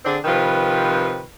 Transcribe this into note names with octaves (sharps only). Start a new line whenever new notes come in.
D3 C4 D4 G#4 D5
C3 D#3 F3 B4